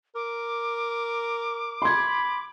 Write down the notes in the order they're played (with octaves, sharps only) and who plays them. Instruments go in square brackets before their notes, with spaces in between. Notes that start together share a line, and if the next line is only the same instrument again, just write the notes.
[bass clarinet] A#4 [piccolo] D6
[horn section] B5 [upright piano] C6 G#6